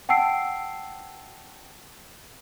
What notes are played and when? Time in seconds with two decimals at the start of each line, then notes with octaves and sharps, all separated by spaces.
0.09 F#5 G5 A5 E6 C7 D7